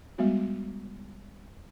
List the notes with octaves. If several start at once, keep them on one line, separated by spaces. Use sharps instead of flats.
G3 G#3 B3 F#4